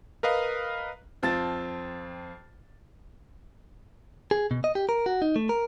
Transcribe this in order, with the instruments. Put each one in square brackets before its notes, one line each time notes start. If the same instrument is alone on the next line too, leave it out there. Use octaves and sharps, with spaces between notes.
[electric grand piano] A#4 B4 D#5 F5
[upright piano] F2 C4 F4 A5 A6
[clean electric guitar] G#4
B2
D#5
G4
A#4
F#4
D#4
A3
A#4